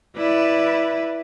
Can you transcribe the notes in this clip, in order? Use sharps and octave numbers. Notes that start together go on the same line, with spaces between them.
E4 B4 D5